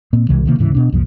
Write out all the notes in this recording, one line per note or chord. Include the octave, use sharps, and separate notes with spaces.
A#2 A#3 C4
C2 C3 E3 G#3
C3 D#3 A#3
D1 G#2 C#3 E3
B2 D4
C2 F#2 A#2 F3